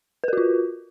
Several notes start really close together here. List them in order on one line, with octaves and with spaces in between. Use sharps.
B4 A#4 F#4 F4